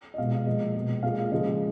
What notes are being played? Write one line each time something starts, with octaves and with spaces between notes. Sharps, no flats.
D#5
B2 G#3 F5
A#2 F3 G#3 D#5
B2 G#3
A#2 G#3 F5
C#3 F3 G#3 D#5